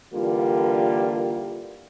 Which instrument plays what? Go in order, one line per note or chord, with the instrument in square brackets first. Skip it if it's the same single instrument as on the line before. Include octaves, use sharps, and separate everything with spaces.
[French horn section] D3 E3 G3 A#3 F4